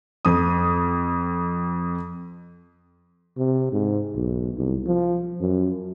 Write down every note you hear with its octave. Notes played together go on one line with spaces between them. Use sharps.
F2 D#6
C3
G#2
B1
C2
F3
F#2